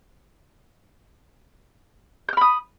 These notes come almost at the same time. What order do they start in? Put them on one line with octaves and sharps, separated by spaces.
G6 F6 B5 D#6